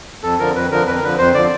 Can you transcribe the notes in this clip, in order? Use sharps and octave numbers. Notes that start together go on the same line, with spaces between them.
F2 A4
D3 F3 A#4
F2 B4
D3 F3 A#4
F2 B4
A#4
D3 F3 B4
F2 C5
D3 F3 D5